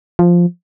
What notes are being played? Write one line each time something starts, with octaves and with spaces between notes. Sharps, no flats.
F3